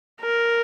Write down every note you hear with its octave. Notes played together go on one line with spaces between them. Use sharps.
A#4